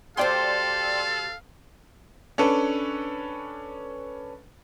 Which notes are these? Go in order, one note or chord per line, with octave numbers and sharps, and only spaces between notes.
D2 G4 A4 C5 D5 F5 G5 C6
C#4 D4 A4 B4